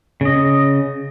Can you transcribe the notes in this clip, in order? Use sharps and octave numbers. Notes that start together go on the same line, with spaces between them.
C#3 D#5